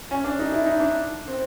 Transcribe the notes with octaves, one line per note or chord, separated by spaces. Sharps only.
C#4
D4
D#4
E4
D#4
D4
C4